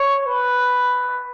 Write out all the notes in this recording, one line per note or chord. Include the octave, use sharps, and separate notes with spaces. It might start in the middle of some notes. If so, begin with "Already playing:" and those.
Already playing: C#5
B4